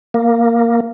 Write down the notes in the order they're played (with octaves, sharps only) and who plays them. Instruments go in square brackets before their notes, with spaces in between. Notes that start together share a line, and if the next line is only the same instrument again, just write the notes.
[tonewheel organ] A#3